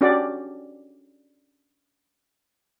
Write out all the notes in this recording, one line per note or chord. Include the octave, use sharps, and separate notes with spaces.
C#4 D4 F#4 G4 D5